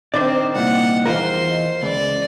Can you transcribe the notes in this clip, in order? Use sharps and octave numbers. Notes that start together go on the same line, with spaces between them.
D#3 C4 D4 D5
C2 A#2 F#5
E2 F4 A#4 C5 C6
C#2 D5